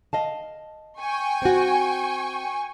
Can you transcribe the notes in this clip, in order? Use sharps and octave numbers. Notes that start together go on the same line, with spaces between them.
D#5 F5 A5
G5 G#5 C#6
C4 F#4